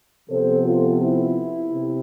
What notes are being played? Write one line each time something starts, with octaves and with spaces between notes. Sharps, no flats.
C3 F3 B3 A4 C5
F4 A4
E4
C3